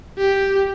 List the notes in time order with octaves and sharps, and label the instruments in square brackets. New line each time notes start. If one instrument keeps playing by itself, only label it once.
[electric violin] G4